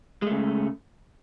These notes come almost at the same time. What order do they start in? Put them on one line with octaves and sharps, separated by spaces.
G#3 A3 C#3